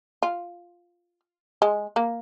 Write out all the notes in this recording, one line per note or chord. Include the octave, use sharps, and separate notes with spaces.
F4
G#3
A#3